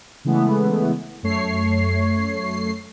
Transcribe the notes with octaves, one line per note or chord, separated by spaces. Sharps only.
C#3 E3 G#3 A3 B3
F#2 A3 C#5 C7